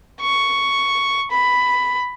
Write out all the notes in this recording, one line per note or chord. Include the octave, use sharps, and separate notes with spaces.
C#6
B5